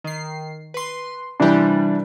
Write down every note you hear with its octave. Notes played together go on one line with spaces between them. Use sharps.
D#3 C7
B4 C6
C3 E3 G3 D4